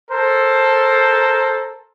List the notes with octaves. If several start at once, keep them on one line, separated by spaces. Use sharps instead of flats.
A4 A#4 C5